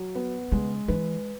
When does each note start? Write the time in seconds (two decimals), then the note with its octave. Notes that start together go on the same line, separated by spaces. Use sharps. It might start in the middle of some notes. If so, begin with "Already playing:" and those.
Already playing: F#3
0.15 B3
0.52 C#3 G#3
0.88 E3 B4